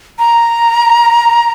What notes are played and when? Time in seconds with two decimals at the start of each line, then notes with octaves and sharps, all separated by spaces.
0.19 A#5